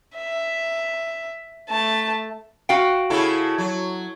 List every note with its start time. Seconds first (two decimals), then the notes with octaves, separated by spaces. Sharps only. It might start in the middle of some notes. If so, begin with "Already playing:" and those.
0.16 E5
1.69 A3 A5
2.69 F#4 F5 G5
3.10 C#3 E4 A4
3.58 F#3